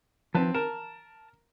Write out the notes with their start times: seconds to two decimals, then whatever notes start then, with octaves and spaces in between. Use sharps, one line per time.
0.34 F3 C4 B4 A5
0.55 A#4 A5